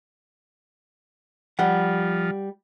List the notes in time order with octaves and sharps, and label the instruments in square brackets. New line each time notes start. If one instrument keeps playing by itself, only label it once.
[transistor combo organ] F3 [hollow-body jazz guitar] G3 F#5